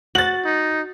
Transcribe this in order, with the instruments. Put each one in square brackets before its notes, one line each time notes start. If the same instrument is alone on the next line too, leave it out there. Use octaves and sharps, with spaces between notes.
[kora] F#4 [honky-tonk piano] A6 F#7
[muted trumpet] D#4